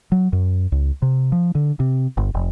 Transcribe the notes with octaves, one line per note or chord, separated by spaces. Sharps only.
F#3
F#2
C#2
C3
F3
D3
C3
G1
F1